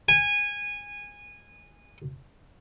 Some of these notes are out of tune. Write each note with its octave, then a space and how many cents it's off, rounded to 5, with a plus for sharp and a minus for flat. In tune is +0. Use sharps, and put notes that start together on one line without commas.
G#5 -20